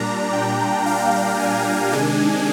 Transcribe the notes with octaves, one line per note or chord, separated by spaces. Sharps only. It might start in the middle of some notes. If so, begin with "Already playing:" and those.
Already playing: A#2 G3 D4 A#5
G5
F5
G#5
C3 D#3 G#3 D4 G#5